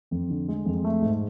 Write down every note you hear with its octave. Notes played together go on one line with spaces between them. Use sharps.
F2
D3
G#3
F2
A3
G#2